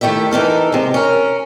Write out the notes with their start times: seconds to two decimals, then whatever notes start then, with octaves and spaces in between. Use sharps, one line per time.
0.01 D#3 A3 E4 G4 E5
0.31 E3 D#4 A4 A#4
0.72 C3 G#3
0.94 C#4 A#4